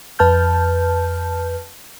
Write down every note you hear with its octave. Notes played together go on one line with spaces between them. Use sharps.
F2 B4 A5 F6 G6